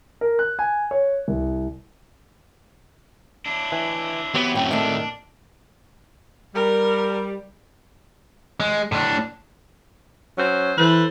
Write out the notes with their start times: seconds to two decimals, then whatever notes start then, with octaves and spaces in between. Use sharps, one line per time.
0.21 A#4
0.39 F#6
0.59 G#5
0.91 C#5
1.28 C2
3.46 D4 E4
3.72 E3
4.35 F#3 B3 C4 E4 G4 B4
4.55 F#2 A2 F#3 A3 C4 G5
4.71 D#3 A3 D4 D5 E5
6.55 G3 A#4
8.60 G#3
8.92 A2 D4
10.37 F#3 C#4 C5
10.78 E3 A4 B4 C5